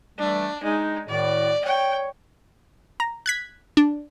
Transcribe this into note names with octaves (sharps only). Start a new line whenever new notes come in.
E3 G3 A3 D4
G#3 D#4
A2 D#3 F#4 D5
C#5 G5
A#5
F#6 G#6 B6
D4